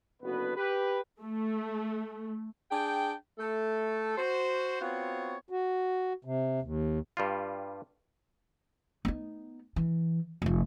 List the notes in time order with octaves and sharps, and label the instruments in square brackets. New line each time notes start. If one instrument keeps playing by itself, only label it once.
[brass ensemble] F#1 D3 B3 F#4 B4
G4 B4
[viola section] A3
[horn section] D4 G#4 G5
A3 A4
F#4 C5
B3 C4 F4 F#4 C#5
[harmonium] F#4
C3
D#2
[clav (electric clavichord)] G2 G3 F4
[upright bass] B3 D#4
E3
F1 F3